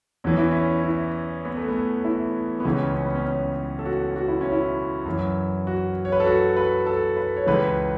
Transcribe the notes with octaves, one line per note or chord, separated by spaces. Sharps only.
E2 E3 C#4
E4
C#4
E4
B3
A3
B3
E4
B3
C#2 C#3 E3 C#4
C#4
B3
C#4
C#4
A4
F#4
F#4
E4
C#4
E4
F#2 E3
F#4
C#5
B4
A4
F#4
B4
A4
B4
C#5
C#2 C#3 E3 B4